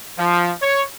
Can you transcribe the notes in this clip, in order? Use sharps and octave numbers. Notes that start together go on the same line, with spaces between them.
F3
C#5